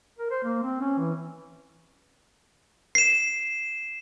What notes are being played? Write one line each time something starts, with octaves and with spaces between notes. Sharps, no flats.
A#4
C5
A#3
C4
C#4
E3
C7 E7